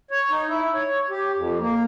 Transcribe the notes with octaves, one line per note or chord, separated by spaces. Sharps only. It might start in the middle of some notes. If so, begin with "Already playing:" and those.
C#5
D#4
E4
C#5
G4
F2
A#3